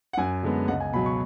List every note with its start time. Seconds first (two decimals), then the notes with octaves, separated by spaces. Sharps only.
0.13 F#5
0.17 F#2 G#5
0.43 D3 G#3 B3
0.68 C#2 F#5
0.80 G#5
0.93 B2 F#3 B5
1.06 C#6